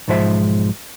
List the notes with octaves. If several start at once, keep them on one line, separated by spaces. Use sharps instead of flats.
B1 G#2 F3 G#3 C5 E5